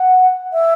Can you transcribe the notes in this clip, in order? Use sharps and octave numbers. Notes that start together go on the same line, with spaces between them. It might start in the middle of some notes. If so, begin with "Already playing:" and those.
Already playing: F#5
E5